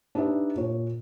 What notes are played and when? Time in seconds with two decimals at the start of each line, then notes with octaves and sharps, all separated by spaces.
0.15 D4 D#4 G4 B4 E5
0.57 A#2 C#5